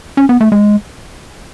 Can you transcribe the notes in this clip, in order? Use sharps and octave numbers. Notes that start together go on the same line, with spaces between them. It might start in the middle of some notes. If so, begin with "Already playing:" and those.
C#4
B3
A3
G#3